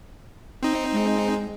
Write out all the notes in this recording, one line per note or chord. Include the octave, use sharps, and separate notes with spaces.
C4 D#4
G#3